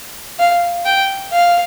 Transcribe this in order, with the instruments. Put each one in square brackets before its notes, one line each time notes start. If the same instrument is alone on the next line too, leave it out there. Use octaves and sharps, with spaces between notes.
[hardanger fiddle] F5
G5
F5